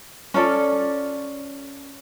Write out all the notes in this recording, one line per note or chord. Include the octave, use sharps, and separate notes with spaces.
C#4 F4 A4 D5